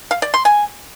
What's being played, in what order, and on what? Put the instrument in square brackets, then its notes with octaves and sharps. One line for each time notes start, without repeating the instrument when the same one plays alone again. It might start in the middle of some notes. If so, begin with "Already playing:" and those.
[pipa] F5
D5
C6
G#5